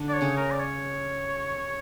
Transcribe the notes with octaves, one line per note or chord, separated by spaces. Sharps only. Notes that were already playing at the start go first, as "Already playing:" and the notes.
Already playing: D3 D4
D5
C#5
C#3 C#4
A#4
D5
C#5